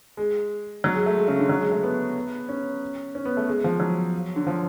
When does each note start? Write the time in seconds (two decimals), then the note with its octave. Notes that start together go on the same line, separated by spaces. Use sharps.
0.17 G#3
0.84 F#3
0.94 G#3
1.06 A3
1.17 G#3
1.28 C#3
1.39 D3
1.49 F#3
1.61 G#3
1.72 A3
1.83 B3
2.49 C#4
3.15 C#4
3.25 B3
3.37 A3
3.48 G#3
3.64 F3
3.80 F#3
4.36 D3
4.47 F3